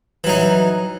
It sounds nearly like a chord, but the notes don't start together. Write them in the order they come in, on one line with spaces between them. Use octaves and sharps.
E3 F#3 D#4